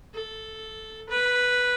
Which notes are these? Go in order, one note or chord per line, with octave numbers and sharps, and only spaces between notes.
A4
B4